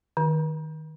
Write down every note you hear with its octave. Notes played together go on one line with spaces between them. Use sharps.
D#3